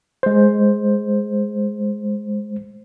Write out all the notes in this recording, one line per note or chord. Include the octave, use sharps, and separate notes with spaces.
G#3 C5